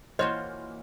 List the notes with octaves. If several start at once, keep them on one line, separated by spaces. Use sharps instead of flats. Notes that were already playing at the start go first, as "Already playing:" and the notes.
A#2 E3 F4 F#4 C5 C#5 D#5 F6